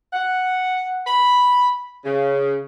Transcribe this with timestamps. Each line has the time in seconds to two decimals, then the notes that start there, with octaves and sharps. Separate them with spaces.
0.13 F#5
1.07 B5
2.05 C#3